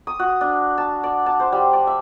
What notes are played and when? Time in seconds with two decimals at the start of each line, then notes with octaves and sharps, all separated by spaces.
0.07 D#6
0.19 F#4
0.41 D4
0.78 A5
1.04 D5
1.26 A5
1.40 C5
1.52 G3
1.73 D5
1.87 E5